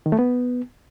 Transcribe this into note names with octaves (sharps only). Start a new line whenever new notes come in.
D#3
A3
B3